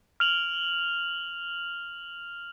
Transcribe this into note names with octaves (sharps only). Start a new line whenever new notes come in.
F6 F7 F#7